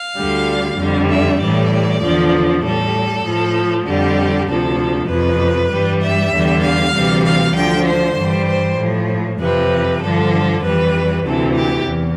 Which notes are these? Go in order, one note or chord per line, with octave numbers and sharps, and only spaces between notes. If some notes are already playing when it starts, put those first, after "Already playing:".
Already playing: F5
D2 D3 G3
F2 D3 G3
E5
A2 E3 G3 D5
E2 D3 F3
A2 G3 A4
A2 F3
F2 D3 G3 G4
D2 C3 F3 A4
F2 C3 F3 B4
G2 E3 G3
E5
E2 D3 G3
F5
D2 C3 E3 G3
F5
D2 D3 F3 G5
C5
G2 E3 G3
C5
A2 F3
F2 C3 F3 B4
G2 D3 F3 A4
F2 E3 G3 B4
D2 C3 E3 A4
G4
E2